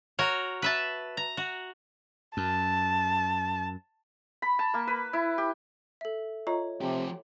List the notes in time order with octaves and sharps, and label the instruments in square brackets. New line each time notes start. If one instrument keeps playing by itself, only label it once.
[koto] F#4 A#4 C#5
B4 E5 A5
A#5
F#4
[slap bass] F#2 [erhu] A5
[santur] B5
A5
A#3
B4
E4
G4
[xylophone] A4 E5
[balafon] F4 D#5 A#5 [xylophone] C#5
[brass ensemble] C3 [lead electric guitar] F3 G4